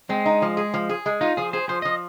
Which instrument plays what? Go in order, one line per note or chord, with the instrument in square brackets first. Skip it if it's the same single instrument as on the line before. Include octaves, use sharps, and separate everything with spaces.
[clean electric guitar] G#3 [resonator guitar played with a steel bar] C4
[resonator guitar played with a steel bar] D#4
F3
G#4
F3
G#4
G#3
[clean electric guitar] D#4 [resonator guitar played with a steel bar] F4
[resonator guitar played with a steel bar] F3 [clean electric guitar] G#4
[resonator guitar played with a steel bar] G#4 [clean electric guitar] C5
[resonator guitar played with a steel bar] F3 [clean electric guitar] C5
[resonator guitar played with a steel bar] F3 [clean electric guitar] D#5